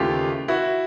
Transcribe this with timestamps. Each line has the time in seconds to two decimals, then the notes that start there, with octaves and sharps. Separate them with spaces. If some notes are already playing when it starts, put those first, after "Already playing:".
Already playing: D#2 C#3 E3 A3 F4 G4
0.48 E4 F#4